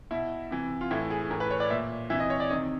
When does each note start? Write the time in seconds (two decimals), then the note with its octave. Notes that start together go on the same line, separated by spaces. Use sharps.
0.11 B2 E4
0.51 C3 E3
0.81 F4
0.91 A2 E3 E4
1.10 G#4
1.30 A2 E3 A#4
1.40 B4
1.51 C#5
1.60 D5
1.70 A#2 E5
2.10 C3 E3 E5
2.20 D#5
2.30 C#5
2.40 D5
2.50 C3 D#3 D#5